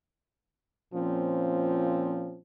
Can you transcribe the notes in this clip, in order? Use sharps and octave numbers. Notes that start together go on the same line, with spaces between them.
A#2 F3 C4 C#4